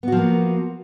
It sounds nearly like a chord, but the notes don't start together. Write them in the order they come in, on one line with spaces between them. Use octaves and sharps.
B3 F#4 F3 A#3